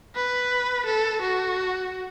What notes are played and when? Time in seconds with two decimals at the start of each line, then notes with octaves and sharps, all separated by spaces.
0.16 B4
0.86 A4
1.22 F#4